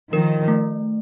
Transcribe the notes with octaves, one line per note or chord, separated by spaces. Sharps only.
D#3 F3 A#4
A3